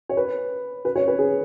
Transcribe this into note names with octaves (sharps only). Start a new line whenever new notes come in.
C#5
B4
B4
C#5
B4
G#4